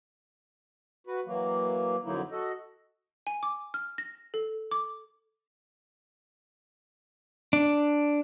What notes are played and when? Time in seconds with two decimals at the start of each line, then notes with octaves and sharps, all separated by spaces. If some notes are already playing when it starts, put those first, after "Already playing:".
1.07 F#4 B4
1.26 E3 F#3 A#3
2.05 F2 D3 F#3 A#3 D#4 E4
2.31 F#4 A4 D#5
3.27 G#5
3.43 D6
3.74 F6
3.98 A#6
4.34 A4
4.71 D6
7.53 D4